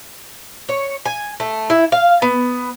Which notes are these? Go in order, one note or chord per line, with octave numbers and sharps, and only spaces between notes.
C#5
G#5
A3
E4
F5
B3